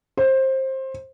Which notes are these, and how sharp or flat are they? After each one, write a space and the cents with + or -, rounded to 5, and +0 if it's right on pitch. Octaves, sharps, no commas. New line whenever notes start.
C5 +20